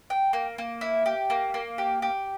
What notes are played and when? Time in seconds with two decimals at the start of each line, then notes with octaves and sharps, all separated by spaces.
0.10 G5
0.33 A#3
0.58 A#3
0.81 E4
1.06 G4
1.30 A#3
1.54 A#3
1.78 G4
2.02 G4